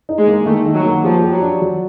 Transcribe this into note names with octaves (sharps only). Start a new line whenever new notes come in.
D#4
G#3
A#3
D#3 A3
D#3
F#3
A#3
F3 G3
G4
F#3
D4
F#3